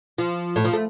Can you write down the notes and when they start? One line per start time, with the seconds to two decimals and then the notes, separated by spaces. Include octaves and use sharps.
0.18 F3
0.56 A2
0.65 F3
0.73 A3